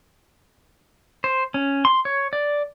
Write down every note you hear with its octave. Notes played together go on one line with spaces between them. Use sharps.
C5
C#4
C6
C#5
D5